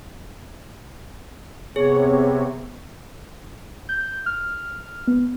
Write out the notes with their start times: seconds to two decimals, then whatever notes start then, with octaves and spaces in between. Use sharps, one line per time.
1.76 C3 B3 G#4 C#5
3.89 G6
4.26 F6
5.07 B3